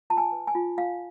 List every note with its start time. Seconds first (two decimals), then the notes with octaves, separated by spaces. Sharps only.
0.10 F4 A5
0.17 G#5
0.32 B4
0.47 G#5
0.55 F4
0.77 F4 F5